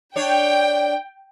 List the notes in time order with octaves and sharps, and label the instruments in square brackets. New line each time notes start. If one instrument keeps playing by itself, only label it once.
[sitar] D4 C#5 [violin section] G5